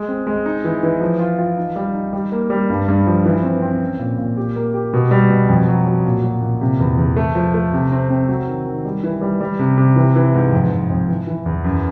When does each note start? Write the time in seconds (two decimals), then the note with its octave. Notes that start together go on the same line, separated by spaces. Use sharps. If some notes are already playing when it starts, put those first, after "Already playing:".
Already playing: G#3
0.08 C4
0.27 G#3
0.46 D#4
0.64 E3
0.83 E3
1.01 F3
1.19 F4
1.39 F4
1.57 D#4
1.76 G3
1.94 D#4
2.13 G3
2.32 A#3
2.50 G3
2.70 G2
2.88 G2
3.07 F3
3.26 E3
3.43 C4
3.62 C4
3.82 C#4
3.99 A#2
4.18 A#2
4.37 G4
4.56 A#3
4.74 G4
4.93 B2
5.11 G3
5.30 B2
5.48 F2
5.68 F#3
5.86 F#3
6.05 A#2
6.23 F#3
6.42 A#2
6.61 C3
6.80 E2
6.98 E2
7.16 A3
7.35 F3
7.54 A3
7.73 C3
7.92 C4
8.10 C4
8.28 F#3
8.47 D#3
8.66 D#3
8.85 G3
9.04 E3
9.21 G3
9.41 G3
9.59 C3
9.78 C3
9.96 E3
10.16 E3
10.34 G#2
10.52 F2
10.71 F2
10.90 F2
11.08 E3
11.27 E3
11.46 E2
11.64 F#2